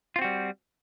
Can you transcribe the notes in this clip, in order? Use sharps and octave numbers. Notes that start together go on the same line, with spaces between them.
G3 C4 F4 F#4